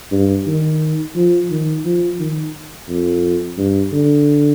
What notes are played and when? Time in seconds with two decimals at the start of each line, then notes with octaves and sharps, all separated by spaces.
0.11 G2
0.47 D#3
1.15 F3
1.50 D#3
1.85 F3
2.19 D#3
2.89 F2
3.58 G2
3.92 D3